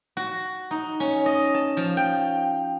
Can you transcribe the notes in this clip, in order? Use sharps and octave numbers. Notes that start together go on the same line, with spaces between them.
F#4
D#4
C#4
D#5
A5
F3
G5